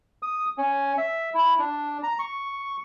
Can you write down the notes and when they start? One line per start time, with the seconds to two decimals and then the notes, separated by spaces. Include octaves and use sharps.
0.23 D#6
0.58 C#4
0.98 E5
1.34 E4
1.59 D4
2.03 A#5
2.19 C#6